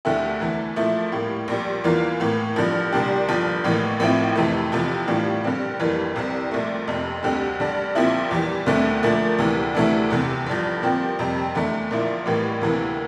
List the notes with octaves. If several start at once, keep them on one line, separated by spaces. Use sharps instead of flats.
D2 D3 A3 E4 G4
E2 E3 A3
A#2 F3 A3 E4
A2 G3 A#3
A#1 A#2 G3
E2 E3 A#3 F4
A2 E3 A#3
G2 D3 F3
C2 A#2 G3 D4 G4
G1 G2 F3
A1 A2 E3 A#3
A1 A2 F3 C4 E4
F2 C3 E3 A3
F1 E2 C3 F3
A2 E3 G3 D4 F4
G2 D3 G3 C4
G1 F2 E3 G3 A#3
C2 C3 G3 C4
A#1 A#2 A3
F1 F2 C3
D2 D3 G3 C4 G4
G2 D3 G3 D4
A#1 A#2 F3 C4 E4
E2 E3 G3
D2 D3 A3 C4
A#2 F3 A3 D4
D2 C3 E3 G3
D2 C3 E3 A3 D4
F1 E2 C3
G1 G2 F3
A#2 F3 C4 G4
F2 C3 G3 C4
E2 D3 A3
A#1 A#2 F3 A#3 E4
A1 A2 E3 G3 A#3
D2 C3 E3 A#3